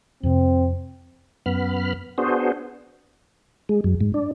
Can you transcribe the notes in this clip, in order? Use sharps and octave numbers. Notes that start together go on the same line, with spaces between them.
F2 C3 C4
F#2 B3 B5 F6
B3 D4 F#4 G#4 C5
G#3
F#2
G#2
D4